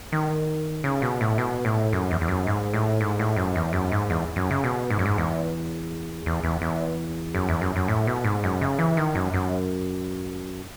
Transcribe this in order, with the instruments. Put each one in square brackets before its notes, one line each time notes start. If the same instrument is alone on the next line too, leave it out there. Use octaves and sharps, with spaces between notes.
[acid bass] D#3
C#3
B2
A2
B2
A2
F#2
E2
E2
F#2
G#2
A2
G#2
A2
F#2
E2
F#2
G#2
E2
F#2
C#3
B2
G#2
F#2
G#2
E2
E2
E2
E2
F#2
E2
F#2
F#2
A2
B2
G#2
F#2
C#3
E3
D#3
F#2
F#2